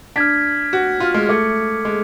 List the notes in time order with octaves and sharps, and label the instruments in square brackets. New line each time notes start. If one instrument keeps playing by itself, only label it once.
[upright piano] D4 [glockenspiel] F6 G#6 B6
[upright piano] F#4
F4
G#3
[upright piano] A3 [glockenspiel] D6 G#6 C#7
[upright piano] G#3